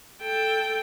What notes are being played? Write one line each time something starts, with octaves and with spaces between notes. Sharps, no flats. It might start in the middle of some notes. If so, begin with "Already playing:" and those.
A4 G5